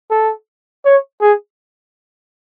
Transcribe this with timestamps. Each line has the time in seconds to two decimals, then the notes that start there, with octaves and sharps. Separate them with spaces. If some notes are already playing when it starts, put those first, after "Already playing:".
0.11 A4
0.85 C#5
1.21 G#4